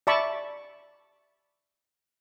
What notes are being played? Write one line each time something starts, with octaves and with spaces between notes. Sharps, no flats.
D5 E5 A5 B5 C#6 D6